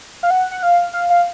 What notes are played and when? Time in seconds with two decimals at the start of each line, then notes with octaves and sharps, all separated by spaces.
0.23 F5
0.30 F#5
0.51 F#5
0.63 F5
0.93 F5
1.10 F5